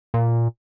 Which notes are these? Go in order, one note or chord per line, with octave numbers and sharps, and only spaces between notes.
A#2